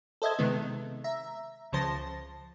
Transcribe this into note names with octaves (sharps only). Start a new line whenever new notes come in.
A4 C5 D#5 E5 G#6
C3 D#3 G#3 B3
E5 A#5
C#2 C#3 F3 C5 A5 A#6